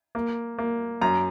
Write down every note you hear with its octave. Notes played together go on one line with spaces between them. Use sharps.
A#3
A#3
F#2 A#5